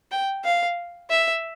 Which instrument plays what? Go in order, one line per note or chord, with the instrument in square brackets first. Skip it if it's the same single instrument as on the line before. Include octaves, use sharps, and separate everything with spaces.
[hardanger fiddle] G5
F5
E5